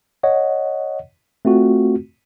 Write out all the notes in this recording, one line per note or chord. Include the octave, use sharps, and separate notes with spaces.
C#5 D#5 F#5
A3 C4 F4 F#4